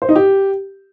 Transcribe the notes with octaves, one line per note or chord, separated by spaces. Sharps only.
C5
D#4
G4